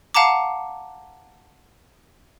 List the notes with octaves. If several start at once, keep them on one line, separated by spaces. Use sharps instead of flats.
F5 F#5 A5 A#5 D6